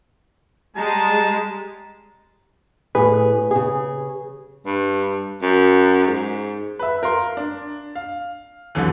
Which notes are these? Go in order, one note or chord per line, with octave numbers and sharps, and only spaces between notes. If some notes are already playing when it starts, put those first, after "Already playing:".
G3 G#3 G#4 A5 A#5
A2 G#4 B4
C#3 G#4
G2
F#2
G#2
B4 E5
A#4 F5 C6
D4
F5
C2 F#2 D3 E3